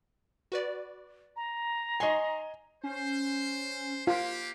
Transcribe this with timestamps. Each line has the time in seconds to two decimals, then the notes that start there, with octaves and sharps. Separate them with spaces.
0.52 F#4 B4 D5
1.36 A#5
2.00 D#5 G#5 C6 C#6 C7
2.83 C#4 C5
4.07 A#3 F4 G4